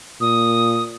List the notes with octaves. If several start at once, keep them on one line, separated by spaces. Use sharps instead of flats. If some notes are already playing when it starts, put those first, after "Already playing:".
A#2 D#6